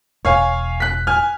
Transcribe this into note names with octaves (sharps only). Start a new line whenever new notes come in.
E1 C#5 F5 G#5
F#6 B6
G#5 F6